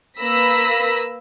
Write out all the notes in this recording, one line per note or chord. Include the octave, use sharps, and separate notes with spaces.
A#3 B4 B5 E6 A#6 B6